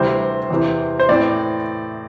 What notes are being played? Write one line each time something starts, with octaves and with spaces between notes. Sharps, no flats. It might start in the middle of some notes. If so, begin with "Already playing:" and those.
Already playing: D2 C3 E3 G3 C4 C5
E2 C3 E3
C5
A2 E3 C4 D5